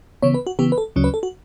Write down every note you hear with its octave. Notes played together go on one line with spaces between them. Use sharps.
C#3 E3 B3 C#5
B4
F#4
C#3 E3 B3 G4
B4
A4
D2 C#3 F#3 C#4
B4
A4
F#4